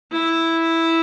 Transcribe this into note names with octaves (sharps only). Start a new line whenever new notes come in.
E4